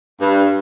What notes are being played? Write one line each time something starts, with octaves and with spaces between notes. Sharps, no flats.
G2